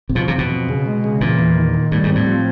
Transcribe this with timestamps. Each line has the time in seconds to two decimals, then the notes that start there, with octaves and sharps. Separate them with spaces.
0.09 C3
0.15 B2 F3
0.28 C3
0.34 F2 B2
0.50 F2
0.69 C#3
0.86 G#3
1.04 C#3
1.21 A#2 E3
1.39 E2
1.57 D#3
1.74 D#3
1.92 A2 G3
2.03 G#2
2.10 C4
2.15 A2
2.26 F3